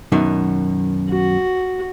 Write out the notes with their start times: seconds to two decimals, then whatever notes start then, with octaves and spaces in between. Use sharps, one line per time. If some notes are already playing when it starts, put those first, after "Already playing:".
0.12 F#2 B2 D#3
1.10 F#4